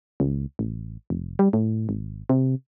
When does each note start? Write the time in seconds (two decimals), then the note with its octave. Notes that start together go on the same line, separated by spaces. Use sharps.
0.20 C#2
0.59 A1
1.10 F1
1.39 G3
1.53 A2
1.89 G#1
2.29 C3